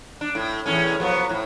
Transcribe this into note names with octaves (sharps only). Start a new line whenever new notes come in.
D4
A2
E2 A2 C#4
F3 F#3 B3
A2